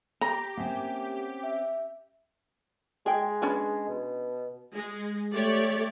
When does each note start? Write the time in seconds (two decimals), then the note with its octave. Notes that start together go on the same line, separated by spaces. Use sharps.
0.21 G4 A#5
0.57 A#3 C4 C#4 F#5
1.43 E5
3.06 G#3 G#4 G5
3.42 C#4 D4 B4
3.89 B2
4.74 G#3
5.34 A3 G4 C#5 D5